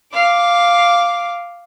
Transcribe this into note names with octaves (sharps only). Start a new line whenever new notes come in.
F5 D6